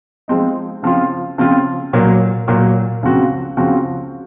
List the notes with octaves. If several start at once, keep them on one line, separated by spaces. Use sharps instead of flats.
F3 G#3 C4 D#4
C#3 F3 C4 F4
C#3 F3 C4 F4
A#2 F#3 A#3
A#2 F#3 A#3
C#2 C#3 F3 C4 F#4
C#2 C#3 F3 C4 F#4